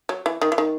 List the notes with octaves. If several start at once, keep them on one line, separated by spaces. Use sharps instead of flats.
F#3
E3
D#3
E3
D#3